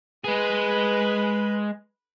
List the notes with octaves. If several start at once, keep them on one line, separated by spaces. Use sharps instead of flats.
G#3 G#4 B4 B5